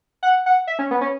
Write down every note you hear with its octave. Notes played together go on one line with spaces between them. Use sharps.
F#5
F#5
E5
C#4
B3
C#4